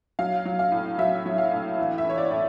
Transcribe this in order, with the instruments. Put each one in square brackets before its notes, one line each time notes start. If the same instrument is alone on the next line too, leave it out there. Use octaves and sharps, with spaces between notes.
[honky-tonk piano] F#3 F5
F#3
F5
A2
F#3 E5
F#3
F5
A2
E3
E5
E3 C#5
D5
A2